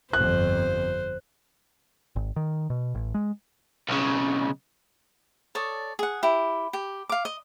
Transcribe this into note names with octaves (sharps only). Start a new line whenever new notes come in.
G1 F2 C5 F#6
G#1
D#3
B2
A1
G#3
B1 C#3
A4 C#5 D5 D#6
G#4 F#5
E4 G4
G4
F5 D6
D#5